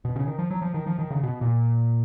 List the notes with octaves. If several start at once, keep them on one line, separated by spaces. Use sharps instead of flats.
B2
C#3
D#3
F3
F#3
F3
D#3
F3
D#3
C#3
B2
A#2